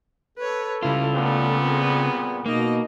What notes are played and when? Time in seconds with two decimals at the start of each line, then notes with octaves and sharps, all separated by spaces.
0.38 A4 B4 C#5
0.82 C#3 G3 E4 F4
1.16 A#2 G3 A3 B3
1.62 C4 G#4
2.46 B2 A#3 D#4 D#5